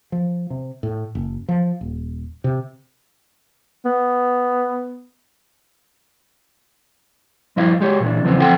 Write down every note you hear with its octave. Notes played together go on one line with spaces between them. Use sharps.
F3
C3
A2
F#1
F3
D#1
C3
B3
G2 F3 E4 D#5 F5
G#3 G4 C#5
A#2 E3 D4
E2 C#3 E3 F3 B3 C4
D2 F3 C4 A4 F#5 G5